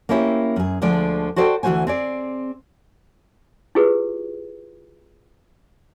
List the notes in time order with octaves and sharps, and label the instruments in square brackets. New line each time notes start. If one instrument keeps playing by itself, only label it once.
[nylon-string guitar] A#3 C4 C#4 E4 G4
F#2 G#4
D2 D3 F3 G#3 D5
F#4 A4 C5 D5 F5 G5
D2 E3 A3 F#4 C5 G#5
C4 G#4 D5
[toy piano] E4 F4 G4 G#4 B4